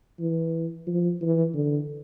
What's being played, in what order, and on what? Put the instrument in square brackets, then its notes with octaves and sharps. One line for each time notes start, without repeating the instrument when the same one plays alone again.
[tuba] E3
F3
E3
D3